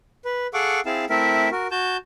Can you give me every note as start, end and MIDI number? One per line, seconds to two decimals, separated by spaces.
0.25 0.47 71
0.54 0.81 68
0.54 0.81 69
0.54 0.81 77
0.54 0.81 78
0.54 0.81 85
0.54 0.81 86
0.86 1.05 60
0.86 1.05 64
0.86 1.05 68
0.86 1.05 77
0.86 1.05 81
1.10 1.49 57
1.10 1.49 60
1.10 1.49 64
1.10 1.49 70
1.10 1.49 76
1.52 1.67 66
1.52 1.67 70
1.71 1.97 66
1.71 1.97 81
1.71 1.97 91